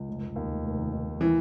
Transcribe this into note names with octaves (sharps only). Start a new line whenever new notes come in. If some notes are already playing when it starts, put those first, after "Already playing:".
Already playing: C#2
F1
F1
D#2
F1
F1
D#3
D#3
F1
E3